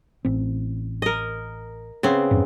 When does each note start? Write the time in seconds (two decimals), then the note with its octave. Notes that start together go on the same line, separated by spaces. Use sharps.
0.25 A1 C4
1.02 A#4 D#5
2.03 C#3 B3 C4
2.31 F2 G#2